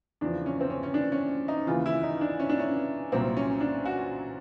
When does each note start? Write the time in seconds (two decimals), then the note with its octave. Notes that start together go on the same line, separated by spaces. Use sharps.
0.21 E2 C#3 F3 D4
0.46 C#4
0.61 C4
0.70 C#4
0.83 C#4
0.94 D4
1.12 C#4
1.48 D#4
1.67 D#2 C#3 E3 F4
1.86 E4
2.03 D#4
2.21 D4
2.40 C#4
2.49 D4
2.60 C#4
3.12 C2 A#2 F#3 C4
3.37 C#4
3.60 D4
3.86 F#4